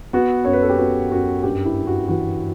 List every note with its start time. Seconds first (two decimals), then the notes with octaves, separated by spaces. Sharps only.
0.13 B3 F#4
0.45 F#2 C#5
0.53 B4
0.62 A4
0.69 G4
0.78 B3 F#4
1.11 F#2 F#4
1.43 G2 G4
1.66 E4
1.76 G2
1.87 F#4
2.08 E3 F#4